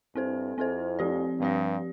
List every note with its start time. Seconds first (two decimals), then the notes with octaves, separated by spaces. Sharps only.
0.15 G2 C4 E4 A4 C5
0.57 F2 C4 E4 A4 C5
0.99 F3 C4 G4 D5
1.40 G2 F3 C4 G4 D5